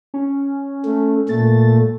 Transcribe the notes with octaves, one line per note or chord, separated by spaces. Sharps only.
C#4
A3
A#2 A3 A6